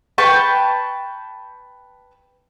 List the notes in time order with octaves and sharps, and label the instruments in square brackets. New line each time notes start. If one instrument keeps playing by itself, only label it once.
[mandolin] B4 G5 A5 C#6